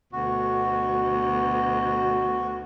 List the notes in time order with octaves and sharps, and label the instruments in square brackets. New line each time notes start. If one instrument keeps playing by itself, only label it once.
[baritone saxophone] D2 [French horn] B2 [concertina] F#4